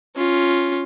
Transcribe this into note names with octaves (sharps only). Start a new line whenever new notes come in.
C#4 F4